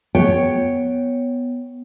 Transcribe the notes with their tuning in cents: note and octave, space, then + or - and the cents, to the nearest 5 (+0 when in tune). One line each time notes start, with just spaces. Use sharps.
B3 +0 C#5 +0 G5 +0